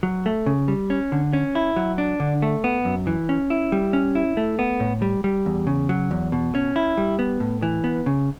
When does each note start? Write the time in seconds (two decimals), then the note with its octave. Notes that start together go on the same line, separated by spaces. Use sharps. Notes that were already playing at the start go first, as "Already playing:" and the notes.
0.03 F#3
0.26 A3
0.46 C#3
0.68 G3
0.90 C#4
1.12 D3
1.33 C#4
1.55 E4
1.76 F#3
1.98 D4
2.20 D3
2.42 A3
2.64 B3
2.85 F#2
3.07 E3
3.29 C#4
3.50 E4
3.72 G3
3.93 C#4
4.15 E4
4.37 A3
4.59 B3
4.80 A2
5.02 G3
5.24 G3
5.46 E2
5.67 C#3
5.89 F#3
6.11 E2
6.32 B2
6.55 C#4
6.76 E4
6.97 G3
7.19 B3
7.40 A2
7.62 E3
7.84 B3
8.06 C#3